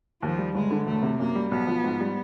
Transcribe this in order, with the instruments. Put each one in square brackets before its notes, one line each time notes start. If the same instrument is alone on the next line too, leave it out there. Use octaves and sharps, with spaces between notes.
[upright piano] D#2 [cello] F3
[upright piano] G3
[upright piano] G1 [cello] G#3
[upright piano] D3
[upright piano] E1 [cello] A3
[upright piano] C3
[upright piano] F#2 [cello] A#3
[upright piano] G3
[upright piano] B1 [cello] B3
[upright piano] F3
G#2
G3